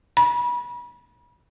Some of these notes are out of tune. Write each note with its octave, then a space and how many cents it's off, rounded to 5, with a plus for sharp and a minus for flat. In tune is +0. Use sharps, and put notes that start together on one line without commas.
B5 -30